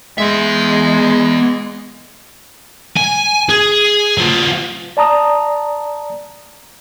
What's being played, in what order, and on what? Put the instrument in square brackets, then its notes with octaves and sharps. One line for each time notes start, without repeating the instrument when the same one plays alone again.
[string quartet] G#3 [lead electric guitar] B3 E5
[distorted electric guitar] G#5
G#4
F#3 F4
[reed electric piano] D5 A5 A#5 D#6